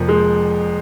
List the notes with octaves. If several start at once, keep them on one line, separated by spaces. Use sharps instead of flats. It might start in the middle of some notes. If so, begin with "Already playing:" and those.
Already playing: F1 F2 F3 A#3
G#3